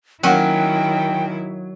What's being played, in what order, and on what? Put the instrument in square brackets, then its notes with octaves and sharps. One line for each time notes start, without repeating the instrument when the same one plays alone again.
[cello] D#3 E4 [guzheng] F#3 [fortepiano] A#3 C#4 F#4 [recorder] G5